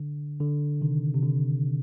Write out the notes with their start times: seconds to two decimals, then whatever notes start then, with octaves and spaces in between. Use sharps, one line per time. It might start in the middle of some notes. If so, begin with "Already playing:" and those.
Already playing: D3
0.40 D3
0.81 C3 D#3
1.15 C3
1.23 D3